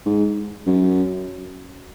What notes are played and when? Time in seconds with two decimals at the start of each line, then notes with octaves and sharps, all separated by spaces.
0.06 G#2
0.66 F#2